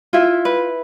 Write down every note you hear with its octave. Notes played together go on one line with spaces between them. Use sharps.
E4 F4 E5
B4